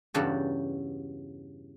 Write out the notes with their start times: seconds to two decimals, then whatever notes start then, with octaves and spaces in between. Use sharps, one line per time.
0.14 E2 G2 C#3 F#4 G4 A4